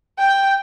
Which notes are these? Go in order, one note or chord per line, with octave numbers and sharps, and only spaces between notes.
G5